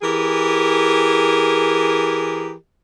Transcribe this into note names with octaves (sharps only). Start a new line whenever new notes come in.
E3 G4 G#4 A#4